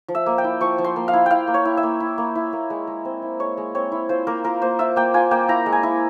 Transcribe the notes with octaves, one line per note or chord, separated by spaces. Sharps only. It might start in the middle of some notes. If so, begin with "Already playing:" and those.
F3
E5
A#3
G5
E4
F3 C#6
F3
C6
A#3
F5
E4
E4 F5 G5
A#3
C#5
E4
E5
A#3
E4
A#3
E4
A#3
G#3
G#3
C4
E4
G#3 C#5
G#3
C4 C#5
E4
F4 C5
A#3 A#4
F4 A#4
A#3 C5
F4 E5
A#3 G5
F4 G#5
A#3 G5
E4 A#5
G#3
G#5
E4